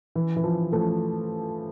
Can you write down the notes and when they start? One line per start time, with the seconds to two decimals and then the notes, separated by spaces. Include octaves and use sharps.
0.16 E3
0.37 E3
0.44 F3
0.72 F3 A3